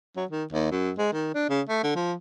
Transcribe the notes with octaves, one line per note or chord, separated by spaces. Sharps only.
F#3
D#3
D#2
F#2
G#3
D#3
D4
C#3
A3
D3
F3